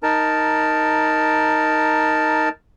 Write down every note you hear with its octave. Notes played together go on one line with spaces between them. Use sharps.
D#4 A#4 A5